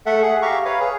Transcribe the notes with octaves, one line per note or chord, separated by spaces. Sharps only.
A3 A4 E5 F#5
G#4 F#5
G4 E5 F5 A#5 C#6
B4 C#5 F5
G#4